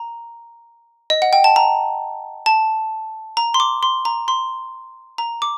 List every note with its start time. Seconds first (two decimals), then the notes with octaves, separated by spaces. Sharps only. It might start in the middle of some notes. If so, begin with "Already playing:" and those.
Already playing: A#5
1.10 D#5
1.22 F#5
1.33 G5
1.44 A5
1.56 A#5
2.46 A5
3.37 A#5
3.54 C6
3.60 D6
3.83 C6
4.05 A#5
4.28 C6
5.18 A#5
5.42 D6